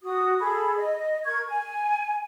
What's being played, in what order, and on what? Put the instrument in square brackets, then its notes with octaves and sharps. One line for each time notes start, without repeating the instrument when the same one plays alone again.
[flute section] F#4 D#6
G#4 A4 B5
D#5
A#4 C#6 G#6
G#5